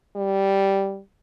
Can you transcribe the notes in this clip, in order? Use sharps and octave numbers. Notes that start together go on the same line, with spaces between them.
G3